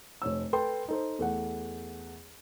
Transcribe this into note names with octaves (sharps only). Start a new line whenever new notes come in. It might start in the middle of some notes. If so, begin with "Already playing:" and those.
F1 C#5 E6
A4 B4 G5 C6
D#4 A4 C5
E2 A3 F#5